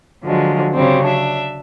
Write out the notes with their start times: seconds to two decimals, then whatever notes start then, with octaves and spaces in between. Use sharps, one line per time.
0.24 D3 F3 F#3 G#3
0.74 C#3 F#3 G3 C4
1.04 D4 E5